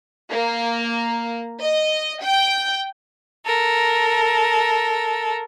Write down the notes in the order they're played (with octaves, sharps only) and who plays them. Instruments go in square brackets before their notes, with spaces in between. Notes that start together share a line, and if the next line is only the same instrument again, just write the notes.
[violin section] A#3
D#5
G5
[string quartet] A4 A#4